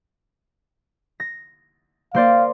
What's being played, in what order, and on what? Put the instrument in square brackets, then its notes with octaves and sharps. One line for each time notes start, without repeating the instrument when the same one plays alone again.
[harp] A#6
[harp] A#3 C5 D5 [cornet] F5